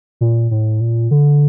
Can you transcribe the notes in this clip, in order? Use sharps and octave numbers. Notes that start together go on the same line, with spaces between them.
A#2
A2
A#2
D3